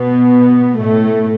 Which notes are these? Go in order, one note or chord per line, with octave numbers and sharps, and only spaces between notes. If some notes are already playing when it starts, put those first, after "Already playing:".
Already playing: B2 B3
A2 A3